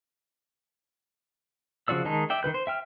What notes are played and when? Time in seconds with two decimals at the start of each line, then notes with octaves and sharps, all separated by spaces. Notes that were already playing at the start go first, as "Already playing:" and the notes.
1.88 C#3 F3 F#4 D5 E6
2.05 D#3 G#3 D#4 A5
2.30 D5 E5 G5
2.43 D#3 F3 B4 G6
2.54 C5
2.67 E5 G5 F6